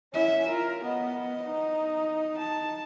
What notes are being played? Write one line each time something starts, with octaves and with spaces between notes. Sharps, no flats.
C#4 E4 E5
F4 A#4
B3 D#5
D#4
A5